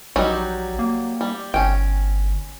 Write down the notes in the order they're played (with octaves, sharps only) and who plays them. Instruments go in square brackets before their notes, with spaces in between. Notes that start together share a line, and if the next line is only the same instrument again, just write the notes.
[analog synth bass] A#1 [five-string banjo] F#3 G3 D#4
[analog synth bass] A#3
[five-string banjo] G3
[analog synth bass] G1 [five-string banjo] C#4 G5